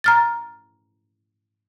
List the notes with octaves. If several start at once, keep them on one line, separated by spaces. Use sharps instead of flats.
A#5 F6 A6